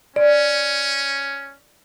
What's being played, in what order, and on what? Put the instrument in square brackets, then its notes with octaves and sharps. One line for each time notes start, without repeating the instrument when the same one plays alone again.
[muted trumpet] C#4 [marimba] D5